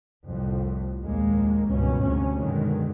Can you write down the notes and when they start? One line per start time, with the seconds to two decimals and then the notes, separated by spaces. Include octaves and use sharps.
0.25 C2 F2 A2
1.01 A#1 D#2 G#3 A#3
1.67 G#1 C#2 G2 B2 C#4
2.01 D2 C3 C#4
2.38 F#2 B2 D3 D#3 F#3 G#3